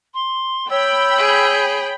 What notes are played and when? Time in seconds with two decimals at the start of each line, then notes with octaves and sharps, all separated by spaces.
0.14 C6
0.70 C#5 G5 B5 E6
1.17 G#4